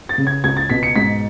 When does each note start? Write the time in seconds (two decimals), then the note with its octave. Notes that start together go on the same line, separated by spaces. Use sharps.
0.09 A6
0.18 C#3
0.27 G#6
0.44 C#2 G#6
0.57 A6
0.69 B2 B6
0.83 C#7
0.95 G#2 B6